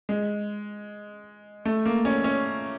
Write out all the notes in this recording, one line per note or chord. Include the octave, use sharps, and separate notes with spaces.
G#3
A3
A#3
C#4
C#4